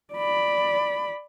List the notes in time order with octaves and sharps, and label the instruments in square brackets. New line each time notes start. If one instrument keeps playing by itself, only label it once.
[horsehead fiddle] D5 B5